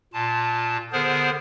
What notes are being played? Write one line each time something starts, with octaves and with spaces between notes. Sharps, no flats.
A#2 F4 A5
D3 B3 G#4 A#4 C5